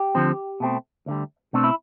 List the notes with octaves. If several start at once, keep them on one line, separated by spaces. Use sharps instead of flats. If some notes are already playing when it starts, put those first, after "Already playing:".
Already playing: G4
D2 D3 F3 C4
B2 A3 C4
D2 D3 G3
B2 A3 C4 D4
E4